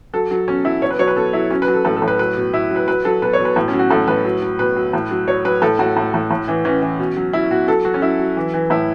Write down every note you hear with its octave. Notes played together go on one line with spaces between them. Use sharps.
F#3 A4
F#3
B2 C#4
F#3 E4
B2 C#5
B4
F#3 C#5
B4
B2 A4
F#3 E4
F#3 C#4
B4
F#3
A4
A2 A4
A4
A2
B4
F#3 B4
B2
B2 E4
F#3
B4
F#3 B4
F#3 A4
B2 B4
C#5
B2
B4
A2
C#4
F#3
F#4
A2 A4
A2 B4
F#3
F#3
B2 B4
F#3
A2
F#3
F#3 C#5
F#3 B4
A2 A4
A2 F#4
A2
A2
A2
E3
E3 C#4
E3
B2
F#3
F#3 E4
B2 F#4
F#3 A4
F#3 F#4
C#4
F#3 E4
F#3
E3
E3
A2 E4